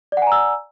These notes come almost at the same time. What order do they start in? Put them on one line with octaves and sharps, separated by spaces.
D5 F#5 G#5 A#5 E6